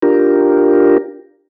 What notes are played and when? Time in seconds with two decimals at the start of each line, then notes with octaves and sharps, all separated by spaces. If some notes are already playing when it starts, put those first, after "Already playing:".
0.02 D4 F4 G4 A#4